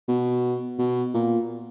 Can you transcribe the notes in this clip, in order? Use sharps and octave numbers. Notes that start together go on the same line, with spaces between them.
B2
B2
A#2